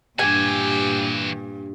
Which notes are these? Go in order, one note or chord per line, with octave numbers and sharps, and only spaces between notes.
G2 A#2 E3 F#4 G4 G#5